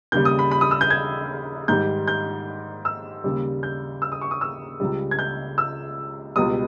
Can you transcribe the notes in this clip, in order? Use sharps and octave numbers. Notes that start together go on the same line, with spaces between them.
D#2 C#3 G3 G6
D#6
B5
B5
D#6
E6
G6
G#6
G#2 D#3 G3 G6
G6
E6
D#2 C#3 G3
G6
E6
D#6
C#6
D#6
E6
C#2 C#3 G3
G#6
G6
E6
C#2 B2 G3 D#6